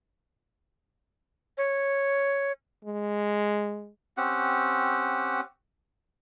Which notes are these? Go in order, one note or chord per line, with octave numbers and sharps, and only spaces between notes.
C#5
G#3
C4 C#4 G4 F#5